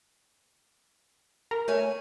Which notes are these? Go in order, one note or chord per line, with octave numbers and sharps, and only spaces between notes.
A#4
A3 C#5 G#5